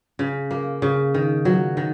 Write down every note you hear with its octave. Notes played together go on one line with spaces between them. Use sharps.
C#3
A#3
C#3
D#3
F#3
D#3